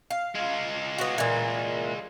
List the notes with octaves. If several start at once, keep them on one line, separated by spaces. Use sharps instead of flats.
F5
G#3 F4
B3 F#4
A#2 E3